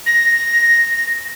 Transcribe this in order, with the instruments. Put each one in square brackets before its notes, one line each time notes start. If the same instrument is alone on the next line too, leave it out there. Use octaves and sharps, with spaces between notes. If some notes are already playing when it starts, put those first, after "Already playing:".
[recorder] A#6